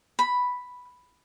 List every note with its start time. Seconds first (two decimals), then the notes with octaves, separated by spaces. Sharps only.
0.19 B5